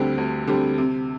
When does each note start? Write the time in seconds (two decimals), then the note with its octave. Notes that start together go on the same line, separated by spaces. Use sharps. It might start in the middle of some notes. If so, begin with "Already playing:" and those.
Already playing: D2 D3 G3 C4
0.18 D2
0.47 D3 G3 C4
0.78 C3